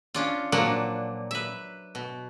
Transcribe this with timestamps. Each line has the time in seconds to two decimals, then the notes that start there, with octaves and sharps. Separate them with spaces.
0.14 C#4 D4 F4
0.52 A#2 F3 F#3 A#3 D4 F#5
1.31 B4 E5
1.95 B2